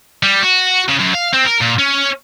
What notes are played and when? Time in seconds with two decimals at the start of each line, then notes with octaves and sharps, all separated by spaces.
0.23 G3
0.42 F#4
0.89 C#3
1.00 F#2
1.15 F5
1.34 C4
1.46 A#4
1.61 A#2
1.79 C#4